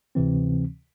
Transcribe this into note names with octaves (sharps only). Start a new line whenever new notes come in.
D2 C3 E3 C4